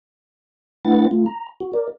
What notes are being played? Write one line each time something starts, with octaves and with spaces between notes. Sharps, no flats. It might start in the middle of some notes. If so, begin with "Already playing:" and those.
A3 D4 E4 B4 F#5 A6
A3 F4
A#5
F#4
A#4 D5